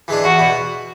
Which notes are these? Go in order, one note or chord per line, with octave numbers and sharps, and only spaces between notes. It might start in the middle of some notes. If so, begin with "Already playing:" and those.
E3 G#3 D4
E2 F#4
B2